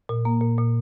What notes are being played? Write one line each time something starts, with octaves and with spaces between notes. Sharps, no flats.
A#2
A#3
A#2
A#2